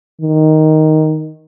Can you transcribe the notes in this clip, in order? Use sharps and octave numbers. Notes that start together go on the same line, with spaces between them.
D#3